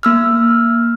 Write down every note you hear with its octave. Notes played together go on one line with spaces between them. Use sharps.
A#3 E6 F6